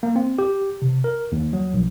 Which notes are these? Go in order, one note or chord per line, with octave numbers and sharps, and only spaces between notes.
A#3
C4
G4
C3
A#4
D#2
F#3
A#1